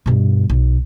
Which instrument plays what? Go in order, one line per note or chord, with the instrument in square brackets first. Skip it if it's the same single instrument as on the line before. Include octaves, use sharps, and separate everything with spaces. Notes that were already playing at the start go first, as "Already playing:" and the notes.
[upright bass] G2 B2
B1